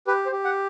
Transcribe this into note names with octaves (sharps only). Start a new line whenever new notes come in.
G4 B4
C5
G4
F#5